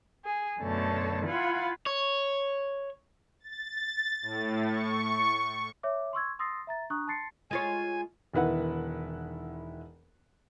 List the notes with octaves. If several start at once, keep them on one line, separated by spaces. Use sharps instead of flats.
G#4
F#2 B2 D3 A3 C#5 A5
E4 F4 F5 F#5 G#5 B5
C#5
A6
A2
C#6
C#5 E5 D6
C6 C#6 E6 G#6
C6 D#6 E6 A6 A#6 C7
E5 A#5 A6
D4 A#5 C#6 D#6 F#6
A5 C6 A6 C7 C#7
G#3 F4 C#5 G#5
E1 D#3 E4 B4 F#5